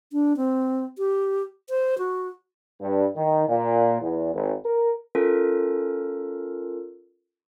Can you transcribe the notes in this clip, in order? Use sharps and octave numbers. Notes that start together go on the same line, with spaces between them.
D4
C4
G4
C5
F#4
G2
D#3
A#2
E2
G#1
A#4
C#4 F4 A4 A#4